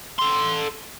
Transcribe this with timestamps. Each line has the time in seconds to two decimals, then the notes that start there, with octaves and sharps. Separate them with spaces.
0.19 A4 C6